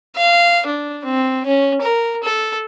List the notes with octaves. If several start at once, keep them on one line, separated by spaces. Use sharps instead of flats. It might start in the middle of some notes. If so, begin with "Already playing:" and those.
F5
D4
C4
C#4
A#4
A4